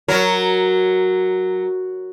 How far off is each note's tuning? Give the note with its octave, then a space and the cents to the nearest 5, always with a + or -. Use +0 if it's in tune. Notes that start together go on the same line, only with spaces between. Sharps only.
F#3 +0 A#4 +0